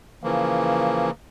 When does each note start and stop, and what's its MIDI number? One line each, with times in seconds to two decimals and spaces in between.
0.23 1.11 49
0.23 1.11 52
0.23 1.11 53
0.23 1.11 58